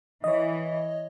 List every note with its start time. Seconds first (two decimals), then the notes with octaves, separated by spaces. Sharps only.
0.24 E3 C#5 D#5